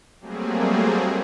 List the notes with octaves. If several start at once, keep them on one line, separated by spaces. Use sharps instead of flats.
F#3 G3 A3 A#3 C4 G#4